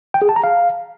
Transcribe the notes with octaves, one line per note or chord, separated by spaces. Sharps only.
G5
G#4
A5
A#5
F5